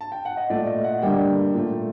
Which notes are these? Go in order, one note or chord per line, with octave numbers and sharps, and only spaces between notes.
A5
G5
F#5
D#5
A#2 A3 D5
D#5
F#5
D3 G3 A#3 G5
A#2 A3